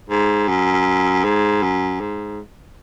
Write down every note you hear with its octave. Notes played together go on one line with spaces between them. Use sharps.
G#2
F#2
G#2
F#2
G#2